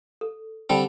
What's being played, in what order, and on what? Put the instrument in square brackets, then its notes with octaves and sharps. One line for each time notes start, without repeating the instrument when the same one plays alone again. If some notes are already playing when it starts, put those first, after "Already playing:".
[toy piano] A4
[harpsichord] D3 G3 C4 [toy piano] G5 A5 B5